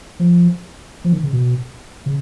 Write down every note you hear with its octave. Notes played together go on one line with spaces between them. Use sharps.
F3
F3
D#3
C#3
B2
C#3